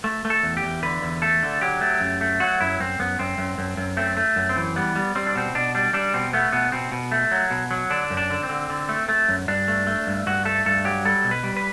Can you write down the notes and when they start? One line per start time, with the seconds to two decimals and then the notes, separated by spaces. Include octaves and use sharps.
0.04 A3
0.25 A3
0.30 A4
0.43 E2
0.57 G4
0.63 E2
0.83 D3 B4
1.02 E2
1.22 A3 A4
1.43 D3
1.61 F#3 G4
1.81 A3
2.00 F#2
2.21 A3
2.40 F#3 F#4
2.61 F#2 E4
2.80 F#2 C4
2.99 F#2 B3
3.19 F#2 C4
3.38 F#2
3.58 F#2
3.77 F#2
3.97 A3 C4
4.17 A3
4.36 F#2
4.49 C4
4.56 E3
4.76 G3 B3
4.96 G3
5.15 G3 C4
5.27 D4
5.35 B2 C4
5.55 B2 D4
5.75 G3 D4
5.93 G3 D4
6.14 B2 C4
6.33 A3 B3
6.52 B2 B3
6.72 B2 C4
6.92 B2
7.12 A3
7.32 F#3
7.51 B2
7.71 F#3
7.90 D3 D4
8.10 F#2
8.17 D4
8.30 D3
8.43 C4
8.49 D3
8.70 D3
8.89 A3
9.09 A3
9.28 F#2
9.48 G2 D4
9.68 A3
9.87 A3
10.07 G2
10.26 G2 F#4
10.45 A3 A4
10.66 G2 A4
10.85 F#3 G4
11.05 G3 A4
11.24 B2
11.31 B4
11.44 G3
11.57 B4